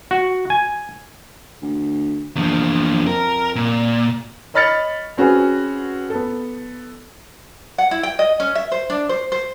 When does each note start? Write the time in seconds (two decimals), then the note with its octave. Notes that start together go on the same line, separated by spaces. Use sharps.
0.11 F#4
0.50 G#5
1.62 D2
2.36 A#1 E2 F3
3.07 F2 A#4
3.56 A#2
4.54 C#5 D#5 B5 F6 A6 C#7
5.17 C4 C#4 F#4 G#4 B4
6.10 B3 A4
7.78 F#5
7.91 E4
8.03 G5
8.19 D#5
8.40 C#4
8.55 E5
8.72 C5
8.90 D4
9.09 C5
9.32 C5